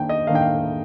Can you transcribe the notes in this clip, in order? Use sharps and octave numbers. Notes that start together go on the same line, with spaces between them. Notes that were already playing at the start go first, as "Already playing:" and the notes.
Already playing: D#3 A#3 D4 G5
D#5
D#3 A#3 D4 F5
G5
F5